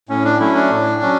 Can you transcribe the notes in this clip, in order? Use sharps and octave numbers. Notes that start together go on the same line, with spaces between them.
A2 C#4
D4
F#3 A3 C#4 E4
D4
A2
F#3 C#4